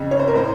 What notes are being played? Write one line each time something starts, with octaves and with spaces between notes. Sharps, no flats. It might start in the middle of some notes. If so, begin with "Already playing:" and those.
Already playing: F2 C#3
C#5
C5
A#4
A2 C5